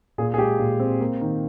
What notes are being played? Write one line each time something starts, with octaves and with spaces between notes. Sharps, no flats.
A#2 G#4
G#4
G#3 G4
A#2
C4
A#3
D#3